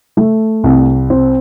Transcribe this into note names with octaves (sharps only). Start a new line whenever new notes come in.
A3
C2
C4